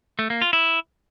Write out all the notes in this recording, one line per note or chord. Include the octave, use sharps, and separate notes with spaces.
A3
A#3
F4
E4